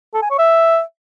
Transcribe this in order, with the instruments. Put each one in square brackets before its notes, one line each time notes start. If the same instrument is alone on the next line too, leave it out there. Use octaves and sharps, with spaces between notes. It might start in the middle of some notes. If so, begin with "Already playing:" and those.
[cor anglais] A4
G#5
C#5
E5